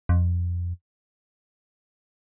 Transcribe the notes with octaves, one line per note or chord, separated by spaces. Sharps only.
F2